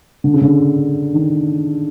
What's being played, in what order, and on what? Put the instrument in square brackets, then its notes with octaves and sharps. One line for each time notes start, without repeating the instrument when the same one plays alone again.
[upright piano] D3
C#3
D3
D#3